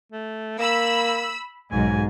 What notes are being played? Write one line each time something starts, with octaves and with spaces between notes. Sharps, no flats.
A3
A#3 B5 E6
B1 G#2 G#5